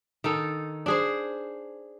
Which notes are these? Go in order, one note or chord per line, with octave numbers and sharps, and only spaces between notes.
D#3 D#4 A4
D4 G#4 C5